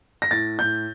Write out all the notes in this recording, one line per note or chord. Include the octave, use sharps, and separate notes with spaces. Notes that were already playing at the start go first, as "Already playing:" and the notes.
A#6
A2 A6
A2 G6